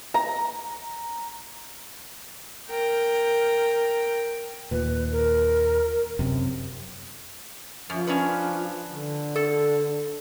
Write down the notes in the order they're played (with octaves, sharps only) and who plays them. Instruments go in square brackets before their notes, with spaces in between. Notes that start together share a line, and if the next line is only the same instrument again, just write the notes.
[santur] A#5
[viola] A#4 G5
[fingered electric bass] D#2 A#2 [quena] B4
[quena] A#4
[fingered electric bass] F#2 C3
[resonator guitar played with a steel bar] F#2 [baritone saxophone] F3
[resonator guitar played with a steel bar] C#4 D4 B4
[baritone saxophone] D3
[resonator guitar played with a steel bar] A4